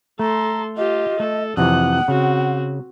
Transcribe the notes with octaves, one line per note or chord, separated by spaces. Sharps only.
A3 A4 A#5 C6
F4 G4 D#5
A3 A4
F2 C3 E3 F#5 D#6 F#6
C#3 C4 F#4